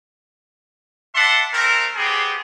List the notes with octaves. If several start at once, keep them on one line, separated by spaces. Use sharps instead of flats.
D5 E5 F#5 A5 C6
A3 C4 A#4
B3 C4 G4 G#4